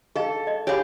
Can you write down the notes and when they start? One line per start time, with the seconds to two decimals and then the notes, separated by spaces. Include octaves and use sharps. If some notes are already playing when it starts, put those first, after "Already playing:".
0.16 G#4 A4 D#5 F5
0.47 D#5
0.67 G4 G#4 C#5 F5 B5